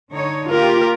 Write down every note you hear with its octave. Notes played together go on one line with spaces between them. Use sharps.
D3 D#4 C#5
A#3 F4 G4 A#4